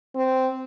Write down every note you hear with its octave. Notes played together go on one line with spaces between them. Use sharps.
C4